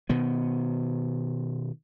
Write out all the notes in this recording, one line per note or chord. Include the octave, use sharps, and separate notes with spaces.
B2 D#3 B3